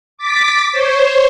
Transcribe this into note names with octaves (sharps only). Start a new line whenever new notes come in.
D6 A6 B6
C5 C#5